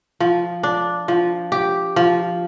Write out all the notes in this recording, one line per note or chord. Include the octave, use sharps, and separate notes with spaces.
F3
D4
F3
G4
F3